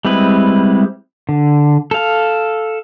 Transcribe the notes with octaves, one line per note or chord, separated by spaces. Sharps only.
G3 G#3 C4 E4 B4
D3
A4 F5